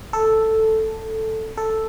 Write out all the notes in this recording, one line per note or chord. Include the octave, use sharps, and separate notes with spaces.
A4
A4